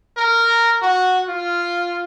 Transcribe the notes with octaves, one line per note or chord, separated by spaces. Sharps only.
A#4
F#4
F4